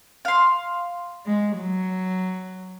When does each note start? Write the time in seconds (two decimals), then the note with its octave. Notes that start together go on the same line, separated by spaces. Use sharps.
0.25 F5 C6
1.26 G#3
1.58 F#3